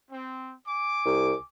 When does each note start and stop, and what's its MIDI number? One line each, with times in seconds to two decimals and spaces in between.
0.11 0.54 60
0.67 1.44 80
0.67 1.44 86
1.06 1.33 36